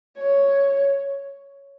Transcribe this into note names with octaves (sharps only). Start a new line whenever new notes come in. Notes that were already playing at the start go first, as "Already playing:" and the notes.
C#5